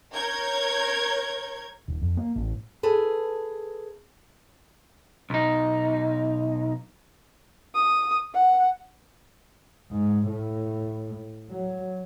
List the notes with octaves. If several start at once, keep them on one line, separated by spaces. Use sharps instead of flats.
A#4 C#5 G6 G#6
D#1
F2
A#3
A1
G#4 A4 B4
B1 D#4
D#6
F#5
G#2
A2
F#3